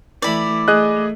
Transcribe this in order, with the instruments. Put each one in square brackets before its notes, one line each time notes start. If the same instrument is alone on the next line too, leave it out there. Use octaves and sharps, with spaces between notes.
[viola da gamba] E3 A3 E4 [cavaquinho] D5 B5
[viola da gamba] A3 [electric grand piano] G#4 D#5 F#6